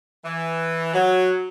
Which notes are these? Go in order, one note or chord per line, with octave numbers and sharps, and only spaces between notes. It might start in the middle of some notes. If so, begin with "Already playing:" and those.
E3
F#3